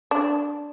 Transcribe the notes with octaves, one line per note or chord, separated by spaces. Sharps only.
D4